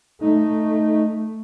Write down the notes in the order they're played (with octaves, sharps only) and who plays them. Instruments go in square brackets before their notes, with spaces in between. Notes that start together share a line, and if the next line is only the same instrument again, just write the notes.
[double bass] A3 [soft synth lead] D#4